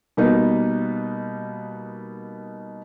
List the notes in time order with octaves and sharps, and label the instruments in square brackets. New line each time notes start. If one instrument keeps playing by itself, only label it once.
[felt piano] B2 G3 A#3 B3 D#4